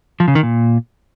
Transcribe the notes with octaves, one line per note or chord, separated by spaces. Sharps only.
F3
C#3
D#3
A#2